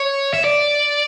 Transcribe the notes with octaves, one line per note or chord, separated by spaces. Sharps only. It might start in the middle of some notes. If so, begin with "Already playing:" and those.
Already playing: C#5
E5
D5